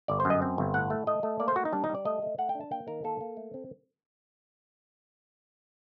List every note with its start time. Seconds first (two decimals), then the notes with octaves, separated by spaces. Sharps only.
0.08 G1 D5
0.20 C5
0.25 F#2
0.30 D#5
0.42 C4
0.58 G1
0.74 A2 F#5
0.90 A3
1.07 A3 D#5
1.23 A3
1.40 A#3 D5
1.48 C5
1.56 A#3 F#4
1.65 D#4
1.72 G3 D4
1.84 D#4
1.89 G3
1.95 D5
2.05 A3 D#5
2.22 A3
2.38 A3 F#5
2.49 G5
2.55 D4
2.61 A5
2.71 A#3 G5
2.88 D#3 A#4
3.04 A#3 A4
3.21 A#3
3.37 A3
3.54 C4